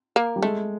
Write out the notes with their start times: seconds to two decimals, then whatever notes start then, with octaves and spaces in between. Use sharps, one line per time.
0.16 A#3
0.36 G3
0.42 G#3 A3